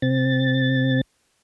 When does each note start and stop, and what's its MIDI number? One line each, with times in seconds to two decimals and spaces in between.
0.02 1.01 48
0.02 1.01 60
0.02 1.01 93